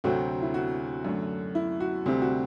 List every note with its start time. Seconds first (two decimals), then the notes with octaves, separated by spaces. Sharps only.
0.04 D2 C3 F#3 A3 C4 F#4
0.42 E4
0.54 F#4
1.05 F#2 D3 A3
1.55 E4
1.80 F#4
2.06 D2 C3 G3 C4
2.22 F#4